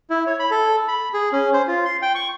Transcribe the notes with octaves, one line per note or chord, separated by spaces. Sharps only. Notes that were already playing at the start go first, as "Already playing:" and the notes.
E4
C#5
B5
A4
B5
G#4
C#4
C5
F4
C6
G5
C#6